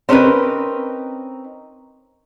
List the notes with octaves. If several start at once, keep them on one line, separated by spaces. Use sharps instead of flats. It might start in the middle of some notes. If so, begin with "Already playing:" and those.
C4 C#4 D#4 A#4 B4